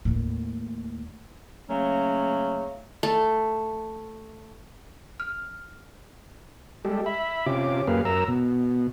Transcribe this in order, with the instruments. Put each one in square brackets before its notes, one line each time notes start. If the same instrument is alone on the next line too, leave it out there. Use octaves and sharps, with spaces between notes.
[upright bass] D#2 A2
[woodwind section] C#3 F#3 A3 A#3 C#4
[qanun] A3
[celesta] F6
[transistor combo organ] G3 G#3 G4 A4
E5 B5
C3 C#4 F4 G4 D6
F#2 A#3 G4 G#4 B4 F5
F#2 A#4 A#5 E6
B2